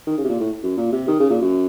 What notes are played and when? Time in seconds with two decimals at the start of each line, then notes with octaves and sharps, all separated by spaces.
0.07 D#3
0.18 C#3
0.24 C3
0.29 A#2
0.40 A2
0.63 F#2
0.77 A#2
0.92 C3
1.08 D#3
1.20 C#3
1.30 A#2
1.41 F#2